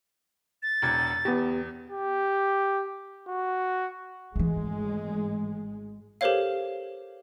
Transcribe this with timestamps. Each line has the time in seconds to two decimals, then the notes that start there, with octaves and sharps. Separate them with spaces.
0.63 A6
0.82 E1 E2 G#6
1.25 E2 B3 G4
1.90 G4
3.28 F#4
4.36 G#1 E3 G#3 A3
6.21 G4 A4 A#4 C5 C#5 F5